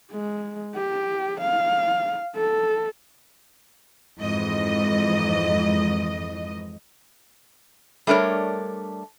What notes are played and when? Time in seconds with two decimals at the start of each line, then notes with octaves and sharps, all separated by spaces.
0.12 G#3
0.75 G4
1.41 F5
2.36 A4
4.19 F2 G#2 E3 D#5
8.07 G3 A3 D4 A#4 C#5